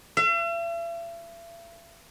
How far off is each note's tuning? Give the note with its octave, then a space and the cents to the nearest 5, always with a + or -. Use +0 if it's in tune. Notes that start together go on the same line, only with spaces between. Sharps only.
E5 +45